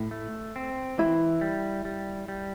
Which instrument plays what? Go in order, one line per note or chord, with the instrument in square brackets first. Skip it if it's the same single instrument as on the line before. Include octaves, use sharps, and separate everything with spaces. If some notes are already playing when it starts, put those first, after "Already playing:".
Already playing: [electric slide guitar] A2
A3
C4
[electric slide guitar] E3 [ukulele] E4
[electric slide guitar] G3
G3
G3